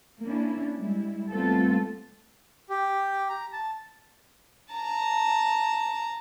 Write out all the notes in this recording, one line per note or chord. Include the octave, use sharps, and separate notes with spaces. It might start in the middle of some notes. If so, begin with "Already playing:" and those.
A#3 C#4 D4 E4
G3 G#3 E4
G3 A3 B3 C4 F4 A4
G4
A#5
A5
A5 A#5